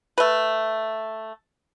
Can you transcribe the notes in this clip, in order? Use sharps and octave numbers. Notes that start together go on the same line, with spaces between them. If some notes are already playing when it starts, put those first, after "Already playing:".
A3 B4